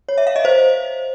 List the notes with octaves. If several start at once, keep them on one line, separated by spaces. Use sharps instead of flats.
C#5
E5
F5
D#5
C5